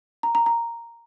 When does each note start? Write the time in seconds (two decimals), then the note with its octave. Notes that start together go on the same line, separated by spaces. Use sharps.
0.23 A#5
0.35 A#5
0.46 A#5